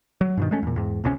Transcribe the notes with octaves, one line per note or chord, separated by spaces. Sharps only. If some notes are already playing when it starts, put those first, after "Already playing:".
F#3
G2 B2 D#3
G#3 A3 C#4
E2 A#2
E2 G#2
E1 C#2 C3 C#4